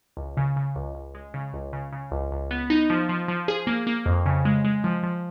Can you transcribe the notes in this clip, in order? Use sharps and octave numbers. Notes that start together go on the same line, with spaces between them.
C#2
C#3
C#3
C#2
C#2
G#3
C#3
C#2
C#3
C#3
C#2
C#2
B3
D#4
F3
F3
F3
G#4
A#3
A#3
F2
C#3
G#3
G#3
F3
F3